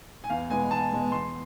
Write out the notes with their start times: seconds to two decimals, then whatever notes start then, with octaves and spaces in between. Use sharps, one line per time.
0.24 G#5
0.30 E2 F5
0.50 B2 G#3 B3 G#5
0.71 E2 A5
0.92 B2 G#3 B3
1.12 E2 C6